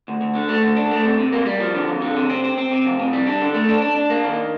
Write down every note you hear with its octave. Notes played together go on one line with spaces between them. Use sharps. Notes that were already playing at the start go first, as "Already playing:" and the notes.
D2
D2
D3
A3
D2
D4
A3
C3
C3
A#3
G3
F3
D3
F2
D3
C3
C4
C4
C4
C3
F2
C3
G3
D4
D3
A3
D4
D4
D4
A#3
D#3